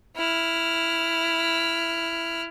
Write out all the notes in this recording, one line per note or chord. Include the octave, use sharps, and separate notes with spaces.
E4 F6